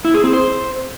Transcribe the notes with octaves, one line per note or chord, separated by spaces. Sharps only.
E4
G#4
C4
C5